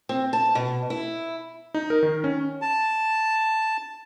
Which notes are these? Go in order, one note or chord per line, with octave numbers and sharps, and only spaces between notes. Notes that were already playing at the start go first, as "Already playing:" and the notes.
C4
A5
B2
E4
D#4
A#4
D#3
C#4
A5